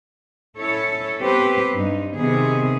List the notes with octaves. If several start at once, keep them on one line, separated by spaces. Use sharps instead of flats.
C#4 E4 A4 C#5
B3 C4 G4 B4 C5
G2 D#4
C3 D#3 B3 G#4